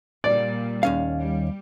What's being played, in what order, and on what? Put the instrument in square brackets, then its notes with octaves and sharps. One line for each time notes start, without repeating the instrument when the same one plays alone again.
[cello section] A#2 G3 [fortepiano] D5
[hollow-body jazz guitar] D#2 C#4 F5
[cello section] G3